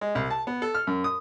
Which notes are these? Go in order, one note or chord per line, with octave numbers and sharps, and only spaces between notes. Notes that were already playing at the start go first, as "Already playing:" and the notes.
G#3
C2
A5
B3
A4
F6
F#2
D#6